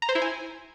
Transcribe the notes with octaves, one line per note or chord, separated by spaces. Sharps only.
A#5
C5
E4
G#5